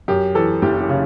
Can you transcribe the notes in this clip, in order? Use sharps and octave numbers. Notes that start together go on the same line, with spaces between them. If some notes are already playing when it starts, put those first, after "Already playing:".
F#2 G4
E3 A4
F#1 G4
G4
C#3